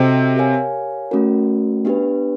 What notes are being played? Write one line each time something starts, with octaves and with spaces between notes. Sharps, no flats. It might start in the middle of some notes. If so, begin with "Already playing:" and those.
Already playing: C3 C4 F#4 A4 C5 D#5 G5
G4 A#4 C#5 F5 G#5
A3 C#4 F#4 A#4
B3 D4 G4 B4